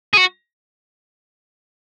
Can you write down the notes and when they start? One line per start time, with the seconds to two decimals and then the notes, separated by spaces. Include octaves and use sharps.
0.14 G#4
0.17 F#4